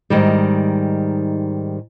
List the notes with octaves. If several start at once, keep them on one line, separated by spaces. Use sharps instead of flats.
G#2 D#3 G3